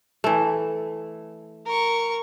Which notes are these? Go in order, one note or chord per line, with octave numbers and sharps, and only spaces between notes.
E3 A3
A#4 C#6